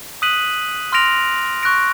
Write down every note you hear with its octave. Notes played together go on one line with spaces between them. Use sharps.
D#6 F#6 B6 D#7 F#7
C6 F6 A#6 D7 F7
C#6 F#6 A#6 D7